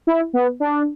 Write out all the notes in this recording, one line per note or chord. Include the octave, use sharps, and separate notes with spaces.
E4
B3
D4